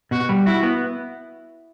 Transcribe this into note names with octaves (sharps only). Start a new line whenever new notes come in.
B2 F#4
G3
E4 F#4
B3